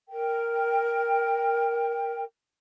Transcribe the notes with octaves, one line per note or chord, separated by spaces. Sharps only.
A#4 G5